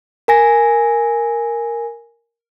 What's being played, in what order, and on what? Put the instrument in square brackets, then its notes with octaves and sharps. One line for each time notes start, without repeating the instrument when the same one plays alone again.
[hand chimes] A#4 G#5 A#6